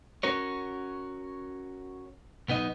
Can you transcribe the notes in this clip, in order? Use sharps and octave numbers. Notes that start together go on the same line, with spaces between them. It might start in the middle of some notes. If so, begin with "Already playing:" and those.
C#4 F#4 A#4 C#5
B1 B3 D#4 D#5